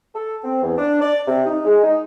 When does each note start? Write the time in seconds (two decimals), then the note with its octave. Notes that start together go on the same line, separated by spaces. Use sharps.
0.14 A4
0.44 C4
0.62 E2
0.78 D4
1.01 D5
1.27 C3
1.46 D#4
1.65 G#3
1.83 D#4